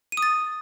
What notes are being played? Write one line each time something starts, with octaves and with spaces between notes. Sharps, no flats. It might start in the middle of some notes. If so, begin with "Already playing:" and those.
D#7
D#6
A6